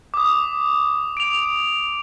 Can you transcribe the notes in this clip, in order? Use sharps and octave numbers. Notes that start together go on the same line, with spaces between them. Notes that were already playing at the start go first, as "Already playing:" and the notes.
D6 D#6
D7 F7